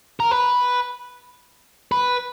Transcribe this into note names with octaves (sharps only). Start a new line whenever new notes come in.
A#4
B4
B4